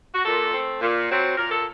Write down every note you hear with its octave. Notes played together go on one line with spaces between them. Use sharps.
F#4
A#2 A4
A3 C4
A#2
F#3 C4
A#2 A#4
A4